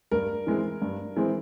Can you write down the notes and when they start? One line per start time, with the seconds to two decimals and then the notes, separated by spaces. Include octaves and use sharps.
0.11 G2 A#4
0.47 E3 G#3 C4
0.82 G2
1.16 E3 G#3 C4